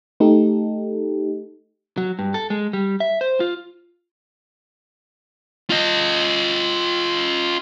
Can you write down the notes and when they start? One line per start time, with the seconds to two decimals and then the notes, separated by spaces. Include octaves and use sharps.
0.20 A3 D#4 G4 A4
1.98 F#3
2.19 G2
2.34 A4
2.50 G#3
2.73 G3
3.00 E5
3.21 C5
3.40 F4
5.70 F4 D#5